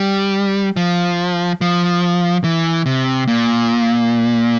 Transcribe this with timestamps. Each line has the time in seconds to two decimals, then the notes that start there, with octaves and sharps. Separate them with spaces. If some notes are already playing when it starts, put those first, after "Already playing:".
Already playing: G3
0.76 F3
1.61 F3
2.44 E3
2.86 C3
3.28 A#2